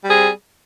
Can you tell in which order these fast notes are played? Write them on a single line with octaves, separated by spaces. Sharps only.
G3 C4 G#4